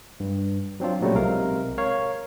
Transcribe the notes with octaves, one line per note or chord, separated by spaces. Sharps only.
G2
F#3 C4 D4 F4
A#2 C#3 F#3 G3 A3
B1 C3 G#3 A#4 F5
A#4 C#5 F5